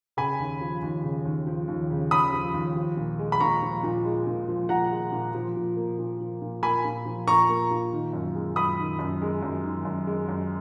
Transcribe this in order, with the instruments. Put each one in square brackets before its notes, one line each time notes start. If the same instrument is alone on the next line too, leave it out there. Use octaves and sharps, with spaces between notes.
[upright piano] C#3 [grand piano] G#5 B5
[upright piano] D#2
F3
D#2
C#3
D#2
F3
D#2
C#3
[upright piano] D#2 [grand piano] B5 D#6
[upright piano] F3
D#2
F3
A#2
G#3
[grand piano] B5
[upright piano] A#2 [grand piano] A#5 C#6
[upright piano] F3
A#2
G#3
A#2
F3
[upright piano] A#2 [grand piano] F#5 A#5
[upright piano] G#3
A#2
F3
A#2
A#3
A#2
F3
A#2
[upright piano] A#3 [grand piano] G#5 B5
[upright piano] A#2
F3
[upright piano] A#2 [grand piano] A#5 C#6
[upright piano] A#3
A#2
D#3
F#2
G#3
[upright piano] F#2 [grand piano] B5 D#6
[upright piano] D#3
F#2
G#3
F#2
D#3
F#2
G#3
F#2